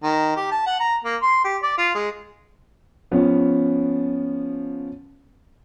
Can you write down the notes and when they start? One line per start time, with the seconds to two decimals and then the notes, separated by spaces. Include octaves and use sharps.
0.03 D#3
0.37 G4
0.51 A5
0.66 F#5
0.80 A#5
1.04 A#3
1.22 C6
1.44 G4
1.63 D5
1.78 F4
1.95 G#3
3.11 F3 B3 C#4